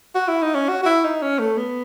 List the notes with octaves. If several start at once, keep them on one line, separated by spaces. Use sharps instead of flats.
F#4
E4
D#4
C#4
F#4
F#4
E4
D#4
C#4
A3
B3